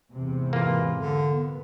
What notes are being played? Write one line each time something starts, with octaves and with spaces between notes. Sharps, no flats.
E2 G#2 C3
E3 A#3 F4
D3
B3